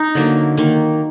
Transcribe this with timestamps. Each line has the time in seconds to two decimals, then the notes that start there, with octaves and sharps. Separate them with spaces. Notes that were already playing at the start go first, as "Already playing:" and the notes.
Already playing: D#4
0.15 D3 F#3 A#3
0.57 D#3 A#3